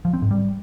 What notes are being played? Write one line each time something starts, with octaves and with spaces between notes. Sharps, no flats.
F3
C4
G#2
G3